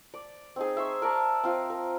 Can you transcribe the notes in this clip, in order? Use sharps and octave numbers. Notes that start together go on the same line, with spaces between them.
D5
C4 D#4 G#4
E5 C6 C#6
A#4 D5 A5 A#5
C4 F4 D#5
A#4